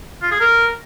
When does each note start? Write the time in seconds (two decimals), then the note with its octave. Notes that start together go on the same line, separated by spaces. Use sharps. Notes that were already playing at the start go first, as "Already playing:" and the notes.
0.22 F4
0.31 G#4
0.40 A#4